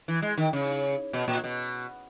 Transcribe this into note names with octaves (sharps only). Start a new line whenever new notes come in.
E3
G#3
D#3
C#3
B2
A#2
B2